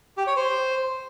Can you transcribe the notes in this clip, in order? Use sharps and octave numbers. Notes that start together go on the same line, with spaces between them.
G4
C#5
C5